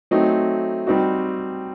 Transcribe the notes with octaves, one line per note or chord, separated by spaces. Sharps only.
F#3 A3 C4 D#4 F#4
G3 C4 D#4 F#4